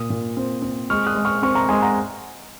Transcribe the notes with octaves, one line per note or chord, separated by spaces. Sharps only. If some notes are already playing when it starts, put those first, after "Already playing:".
Already playing: A#2 D#6
A#2
C4
C4
G#3 C#6 F6
D#6 F#6
G#3
C#6 F6
C4 C#6 F6
A#5 C#6
G#3 G#5 C6
F#5 A#5